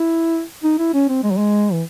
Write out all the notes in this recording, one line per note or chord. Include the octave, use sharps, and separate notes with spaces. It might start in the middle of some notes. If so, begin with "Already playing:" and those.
Already playing: E4
D#4
E4
C#4
C4
G#3
F#3
G#3
E3